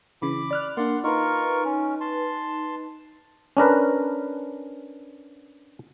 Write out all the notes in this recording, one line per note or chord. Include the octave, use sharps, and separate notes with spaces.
C#3 E3 B5 D6
D5 F6 F#6
A#3 D4 D5 F#5 C6
D#4 F4 A#4 B4 C#6
C#4
A5 C6
C#4 D4 A#4 B4